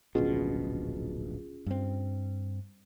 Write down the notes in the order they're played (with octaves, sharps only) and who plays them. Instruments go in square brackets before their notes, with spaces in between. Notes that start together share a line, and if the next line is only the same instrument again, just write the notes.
[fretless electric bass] D1 A#1 B2 [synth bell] C#4 F4 G#4
[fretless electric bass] G2 C4